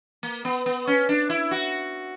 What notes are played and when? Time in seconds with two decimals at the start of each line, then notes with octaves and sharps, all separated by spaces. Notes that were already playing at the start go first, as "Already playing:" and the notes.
0.23 A#3
0.45 B3
0.66 B3
0.87 C#4
1.09 D4
1.30 E4
1.51 F#4